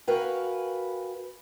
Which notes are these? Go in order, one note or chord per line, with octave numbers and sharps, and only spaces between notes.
F#4 A#4 B4 F5 G5 G#5